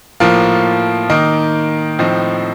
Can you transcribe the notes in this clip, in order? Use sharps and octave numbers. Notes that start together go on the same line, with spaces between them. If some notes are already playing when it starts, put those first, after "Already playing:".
A2 F3 A#3 F4
D#3 A#3 D#4
A2 F3 C4 D#4